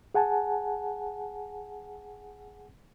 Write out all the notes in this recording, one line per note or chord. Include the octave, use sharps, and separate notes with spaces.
G#4 F#5 G#5 A5